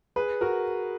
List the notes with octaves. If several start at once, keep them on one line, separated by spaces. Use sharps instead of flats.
G#4 B4
F#4 A#4